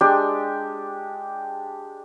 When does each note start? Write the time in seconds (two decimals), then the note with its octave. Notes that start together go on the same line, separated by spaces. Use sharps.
0.01 G#3 D4 G4